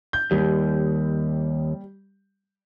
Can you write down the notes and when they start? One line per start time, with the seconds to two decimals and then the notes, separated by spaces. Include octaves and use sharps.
0.13 G6
0.31 D#2 G3